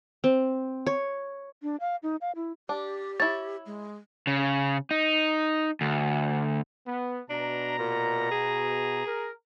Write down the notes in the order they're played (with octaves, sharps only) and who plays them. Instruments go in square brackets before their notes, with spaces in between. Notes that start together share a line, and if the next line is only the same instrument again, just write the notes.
[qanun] C4
C#5
[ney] D4
F5
D#4
F5
E4
[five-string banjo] D4 [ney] G4
[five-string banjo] E4 C#5 [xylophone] A6
[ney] G#3
[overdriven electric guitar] C#3
D#4
D2
[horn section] B3
[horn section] B2 A#5 [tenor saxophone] D4
[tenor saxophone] A#2
G#4
[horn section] A#4